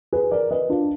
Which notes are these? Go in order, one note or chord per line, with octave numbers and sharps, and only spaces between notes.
G#4 B4
A#4 D5
B4 D#5
D4 F4